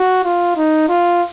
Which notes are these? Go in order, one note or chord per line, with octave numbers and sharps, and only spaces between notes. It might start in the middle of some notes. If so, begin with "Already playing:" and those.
Already playing: F#4
F4
D#4
F4